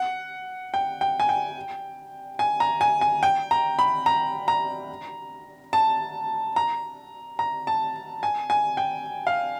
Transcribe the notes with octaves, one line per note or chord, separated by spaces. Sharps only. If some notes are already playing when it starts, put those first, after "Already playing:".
Already playing: F#5
G5
G5
G#5
G5
G#5
A#5
G#5
G#5
G5
A#5
B5
A#5
A#5
A5
A#5
A#5
A5
G#5
G#5
G5
F5